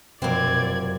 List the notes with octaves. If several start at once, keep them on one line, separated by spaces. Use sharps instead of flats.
F1 F#2 B2 A#3 C4 D5 G#6